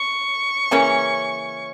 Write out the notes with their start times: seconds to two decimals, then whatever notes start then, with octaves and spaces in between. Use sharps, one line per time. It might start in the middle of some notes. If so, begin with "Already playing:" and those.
Already playing: C#6
0.71 C#3 E3 A#3 C#4